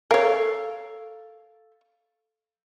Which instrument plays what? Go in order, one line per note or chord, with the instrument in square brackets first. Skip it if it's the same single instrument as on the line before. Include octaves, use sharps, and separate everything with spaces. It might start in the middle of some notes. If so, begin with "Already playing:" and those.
[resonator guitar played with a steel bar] A4 F5 [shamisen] A#4 C#5